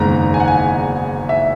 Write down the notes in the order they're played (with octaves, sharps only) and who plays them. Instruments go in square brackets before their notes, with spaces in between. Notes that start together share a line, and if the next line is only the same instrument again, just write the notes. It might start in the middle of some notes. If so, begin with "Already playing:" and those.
Already playing: [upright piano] F#1 E2 D#3 G#3 B3 A#5
G#5
F#5
G#5
E5